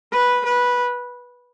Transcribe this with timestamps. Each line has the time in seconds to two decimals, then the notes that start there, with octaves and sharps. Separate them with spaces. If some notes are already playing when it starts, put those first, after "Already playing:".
0.12 B4
0.45 B4